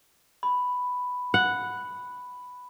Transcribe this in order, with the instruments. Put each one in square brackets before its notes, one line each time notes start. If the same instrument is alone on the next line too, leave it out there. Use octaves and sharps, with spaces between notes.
[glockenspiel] B5
[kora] F#5